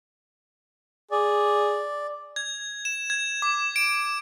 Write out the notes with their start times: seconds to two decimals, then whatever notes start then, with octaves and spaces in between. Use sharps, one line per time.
1.11 G#4 D5
2.36 G#6
2.85 E7
3.10 G#6
3.42 D6
3.76 D7